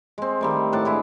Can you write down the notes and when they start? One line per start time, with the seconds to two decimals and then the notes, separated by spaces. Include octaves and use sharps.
0.18 G#3 C4
0.41 D#3 G3 A3
0.73 A2 D4 F#5 A5
0.85 G#3 E4 E5